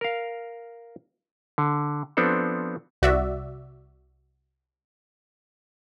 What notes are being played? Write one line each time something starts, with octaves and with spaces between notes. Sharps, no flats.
A#4 F5
D3
F3 B3 C4 D4 A4
C2 F#4 D5 E5